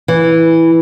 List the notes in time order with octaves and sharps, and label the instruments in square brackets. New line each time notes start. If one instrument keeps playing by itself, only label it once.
[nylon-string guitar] E3